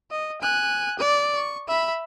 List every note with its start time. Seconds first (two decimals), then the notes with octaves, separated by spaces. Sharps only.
0.11 D#5
0.41 G#5 F#6
0.99 D5
1.36 C#6
1.68 E5 B5